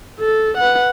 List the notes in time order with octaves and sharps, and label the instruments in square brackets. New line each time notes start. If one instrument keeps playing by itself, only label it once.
[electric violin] A4
B4 F#5